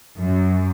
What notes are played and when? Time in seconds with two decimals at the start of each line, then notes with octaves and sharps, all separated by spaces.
0.19 F#2